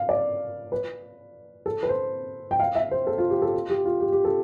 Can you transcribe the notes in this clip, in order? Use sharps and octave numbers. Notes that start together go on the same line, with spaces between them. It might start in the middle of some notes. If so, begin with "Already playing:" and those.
Already playing: F5
D5
B4
A4
B4
C5
G5
F5
E5
C5
A4
F4
G4
A4
F4
G4
F4
G4
G4
A4